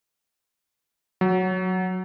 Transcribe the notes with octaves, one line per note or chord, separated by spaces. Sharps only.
F#3